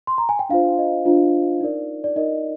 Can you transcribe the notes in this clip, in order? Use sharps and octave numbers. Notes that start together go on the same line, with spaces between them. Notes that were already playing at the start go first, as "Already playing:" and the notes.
C6
A#5
G#5
G5
D4 F4 C5 F5
D#5
D4 F4 C5
D#4 A#4 D5
D5
D#4 A#4 D5 D#5